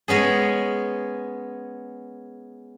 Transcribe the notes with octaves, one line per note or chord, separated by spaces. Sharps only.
G#3 B3 C#4 G#4